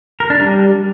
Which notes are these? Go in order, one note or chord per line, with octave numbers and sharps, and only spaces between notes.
A#4
D4
G3